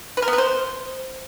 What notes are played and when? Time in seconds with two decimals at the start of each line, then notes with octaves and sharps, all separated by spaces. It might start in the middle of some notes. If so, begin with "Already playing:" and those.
0.17 B4
0.22 A#4
0.28 B3
0.33 B4
0.38 C5